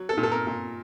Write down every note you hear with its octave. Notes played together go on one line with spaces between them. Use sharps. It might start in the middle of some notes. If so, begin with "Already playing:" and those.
Already playing: F#3
A4
A#2
A4
A#4
A#2